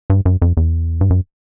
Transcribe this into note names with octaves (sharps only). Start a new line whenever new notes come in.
G2
F#2
F2
E2
G2
F#2